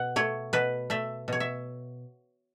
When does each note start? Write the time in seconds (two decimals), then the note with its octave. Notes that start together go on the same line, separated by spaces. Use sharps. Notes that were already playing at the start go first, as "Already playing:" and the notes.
Already playing: B2 F#5
0.16 A3 C#5
0.53 B2 B4
0.90 A3 E5
1.28 B2 C#5
1.40 E5